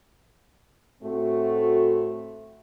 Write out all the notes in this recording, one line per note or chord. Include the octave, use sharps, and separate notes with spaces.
A2 A3 C4 F#4